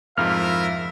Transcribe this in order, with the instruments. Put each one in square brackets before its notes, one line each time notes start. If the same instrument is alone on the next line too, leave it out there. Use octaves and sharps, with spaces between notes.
[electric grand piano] F2 G#2 F3 [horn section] E4 F4 A#4 [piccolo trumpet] E5 [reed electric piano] F6